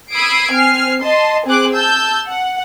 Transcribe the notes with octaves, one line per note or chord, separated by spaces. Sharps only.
B5 D#6 E6 G#6 C7 D7
C4 G#5 F6 C7
D#5 A5 C6
C4 G#4 C5 D6 F#6
A5 E6 G6
F#5